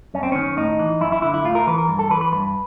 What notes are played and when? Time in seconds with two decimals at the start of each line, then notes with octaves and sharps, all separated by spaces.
0.14 F#2 C#4
0.23 C4
0.32 D#3 C#4
0.57 A2 D#4
0.79 E3
1.01 F#2 E4
1.12 E4
1.22 D3 E4
1.34 E4
1.44 A2 F4
1.55 A#4
1.67 E3 B4
1.78 A#4
1.88 G2
1.99 A4
2.10 E3 B4
2.21 B4
2.32 G2 B4